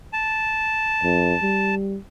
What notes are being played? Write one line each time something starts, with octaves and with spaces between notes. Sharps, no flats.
A5
F2
G3